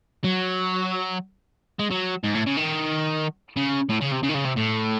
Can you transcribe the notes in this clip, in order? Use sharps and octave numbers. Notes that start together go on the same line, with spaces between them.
F#3
G#3
F#3
G#2
A2
C#3
D#3
C#3
A2
C#3
C3
C#3
D#3
C#3
C3
A2